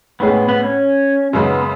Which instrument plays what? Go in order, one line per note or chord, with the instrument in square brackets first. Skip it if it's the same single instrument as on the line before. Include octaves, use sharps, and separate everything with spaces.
[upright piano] A2 G#3 C#4 G#4 [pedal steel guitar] B3
[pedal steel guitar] B3
C#4
[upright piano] F#2 C#3 G#3 [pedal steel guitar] B3